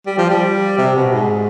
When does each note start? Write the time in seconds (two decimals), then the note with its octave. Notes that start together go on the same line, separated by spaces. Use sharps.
0.06 G3
0.18 F3
0.30 G3
0.78 C3
0.95 B2
1.13 G#2